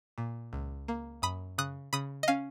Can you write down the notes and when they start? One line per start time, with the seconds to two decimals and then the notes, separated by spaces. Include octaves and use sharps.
0.18 A#2
0.53 C#2
0.88 A#3
1.22 F#2 B5 D#6
1.58 C#3 D#6 F#6
1.93 C#3 B5 D#6
2.23 D#5
2.28 C#4 F5